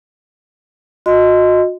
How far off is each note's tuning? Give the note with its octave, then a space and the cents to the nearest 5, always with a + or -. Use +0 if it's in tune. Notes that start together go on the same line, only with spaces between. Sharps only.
F#4 -35 D#5 +0 C6 -20